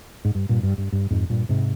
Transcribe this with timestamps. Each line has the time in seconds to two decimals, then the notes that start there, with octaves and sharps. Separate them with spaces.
0.25 G#2
0.35 G2
0.49 G2 A#2
0.63 G2
0.78 G2
0.92 G2
1.11 F2 G#2
1.30 G2 A#2
1.49 G#2 C3